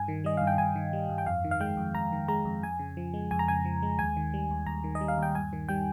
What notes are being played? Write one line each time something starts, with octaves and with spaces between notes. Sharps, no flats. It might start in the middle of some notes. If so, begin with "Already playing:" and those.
Already playing: G2 G#5
D#3
G3 D#5
G2 F5
G5
G2 G#5
D#3
G3
G2
G5
F2 F5
D#3
F5
G#3 G5
F2
F2 A#5
D#3
G#3 A#5
F2
F2 G#5
C#3
F3
G#3
F2 G#5
A#5
C#3 G#5
F3
G#3
D#2 G#5
D#3
G3
D#2
D#2 A#5
D#3
D#5
G3
F5
D#2 G5
G2 G#5
D#3
G3 G5